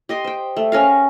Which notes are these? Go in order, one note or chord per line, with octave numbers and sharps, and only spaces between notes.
G4 D#5 C6
C5 G5
A3
C#4 A#4 F5